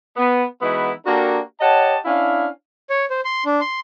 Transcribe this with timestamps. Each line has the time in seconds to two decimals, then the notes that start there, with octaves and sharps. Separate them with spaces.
0.17 B3
0.61 E3 G#3 B3 D#4 E4 F#4
1.06 A#3 D4 F#4 G4 A4 A#4
1.61 G4 C#5 D#5 F#5 A5
2.04 C#4 D4 E4 F5
2.90 C#5
3.10 C5
3.25 C6
3.46 D4
3.61 C6